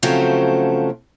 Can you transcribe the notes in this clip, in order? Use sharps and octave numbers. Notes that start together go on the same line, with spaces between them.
C#3 F3 F#3 A3 C4 F#4